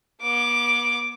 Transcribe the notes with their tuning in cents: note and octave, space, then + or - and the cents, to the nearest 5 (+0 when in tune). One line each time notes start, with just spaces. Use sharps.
B3 -40 D6 +0